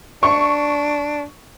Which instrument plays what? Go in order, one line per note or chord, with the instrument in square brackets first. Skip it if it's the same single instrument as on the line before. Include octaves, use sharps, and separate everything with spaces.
[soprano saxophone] D4 [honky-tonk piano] C#6